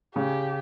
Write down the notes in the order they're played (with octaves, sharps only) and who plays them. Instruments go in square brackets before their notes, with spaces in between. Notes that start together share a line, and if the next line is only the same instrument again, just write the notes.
[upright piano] C#3 [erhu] G4